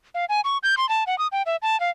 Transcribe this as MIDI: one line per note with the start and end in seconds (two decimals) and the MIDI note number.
0.15 0.25 77
0.29 0.41 80
0.45 0.58 85
0.63 0.75 91
0.77 0.89 84
0.89 1.04 81
1.07 1.18 78
1.19 1.27 87
1.32 1.42 79
1.46 1.56 76
1.62 1.79 81
1.80 1.90 77